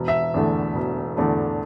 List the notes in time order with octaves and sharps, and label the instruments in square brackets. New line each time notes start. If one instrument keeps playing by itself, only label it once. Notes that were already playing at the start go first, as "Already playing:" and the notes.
Already playing: [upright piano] E1
E5
E2 D3 A3
E1
E2 D3 A3